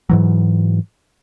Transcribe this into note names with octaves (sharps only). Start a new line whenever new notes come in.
G#2 E3 F#3